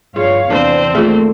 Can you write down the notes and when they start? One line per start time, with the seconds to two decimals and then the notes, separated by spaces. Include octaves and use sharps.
0.16 G2 F4 G#4 C#5 F5
0.50 E2 C3 C4 D4 C5
0.95 D#3 A3 A#3 F4 G#4